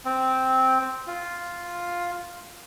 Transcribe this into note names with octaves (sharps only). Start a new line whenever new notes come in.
C4
F4